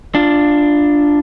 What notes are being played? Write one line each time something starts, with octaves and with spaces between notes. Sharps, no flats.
D4 F4